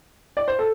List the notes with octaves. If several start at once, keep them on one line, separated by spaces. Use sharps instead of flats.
D5
C5
A4